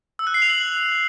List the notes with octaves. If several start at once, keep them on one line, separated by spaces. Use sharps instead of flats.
E6
F#6
C7
F7
F#7